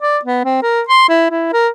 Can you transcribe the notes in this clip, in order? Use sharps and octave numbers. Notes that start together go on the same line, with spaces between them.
D5
B3
C4
A#4
C6
E4
E4
A#4